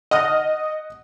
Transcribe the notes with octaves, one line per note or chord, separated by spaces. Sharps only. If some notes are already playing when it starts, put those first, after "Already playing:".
D#5 F#5 D#6 F6